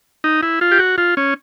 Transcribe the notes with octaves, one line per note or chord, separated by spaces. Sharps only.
D#4
E4
F4
G4
F#4
F4
C#4